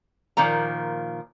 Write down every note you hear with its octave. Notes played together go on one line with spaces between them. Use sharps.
A#2 D#3 F3 A#3 A#5